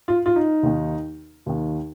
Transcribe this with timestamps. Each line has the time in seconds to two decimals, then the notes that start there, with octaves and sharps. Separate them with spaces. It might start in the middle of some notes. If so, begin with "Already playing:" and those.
0.08 F4
0.26 F4
0.36 D#4
0.63 D#2 D#3
1.46 D#2 D#3